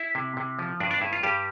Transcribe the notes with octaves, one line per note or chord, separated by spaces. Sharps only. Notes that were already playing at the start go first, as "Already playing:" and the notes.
Already playing: E4 E5
C3
C3
F3
G2 D4 D5
D4 D5
G2 E4
F4
G2 G3 G4